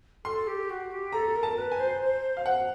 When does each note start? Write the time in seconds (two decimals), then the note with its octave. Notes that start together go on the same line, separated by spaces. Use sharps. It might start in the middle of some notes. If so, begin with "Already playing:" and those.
0.24 A4 C6
0.46 G4
0.69 F#4
0.91 G4
1.12 A4 A#5
1.35 A#4
1.43 A5
1.57 B4
1.72 G#5
1.79 C5
2.01 C5
2.37 F5
2.46 F#5